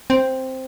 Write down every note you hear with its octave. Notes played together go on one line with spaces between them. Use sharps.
C4